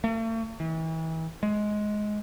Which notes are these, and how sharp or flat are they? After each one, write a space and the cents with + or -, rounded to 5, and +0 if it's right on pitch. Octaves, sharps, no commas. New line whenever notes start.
A3 +45
E3 -35
G#3 +15